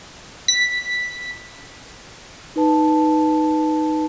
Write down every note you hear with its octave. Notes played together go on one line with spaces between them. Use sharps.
B6
D#4 B4 A5